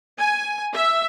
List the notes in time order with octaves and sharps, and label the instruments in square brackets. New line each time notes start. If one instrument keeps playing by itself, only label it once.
[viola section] G#5
E5